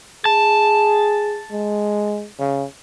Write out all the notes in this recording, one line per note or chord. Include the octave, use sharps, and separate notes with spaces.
G#4 A5
G#3
C#3